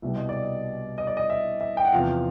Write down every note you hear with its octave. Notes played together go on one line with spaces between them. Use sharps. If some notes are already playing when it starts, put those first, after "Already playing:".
C2 B2 G3 E5
D#5
D5
D#5
D#5
D5
D#5
E5
E5
G5
F#5
E2 C3 F3 F5